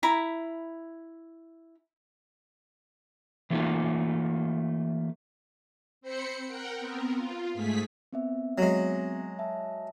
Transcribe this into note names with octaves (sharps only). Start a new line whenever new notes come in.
E4 A#5 B5
E3 F#3 A3 A#3 D#4 F4
C4 C5 B5 C#7
A#4 F#5 G5
B3 C4 A#4
F4
G#2 A3 G#4 B6
B3 C4 E5
F#3 G#3
E5 A5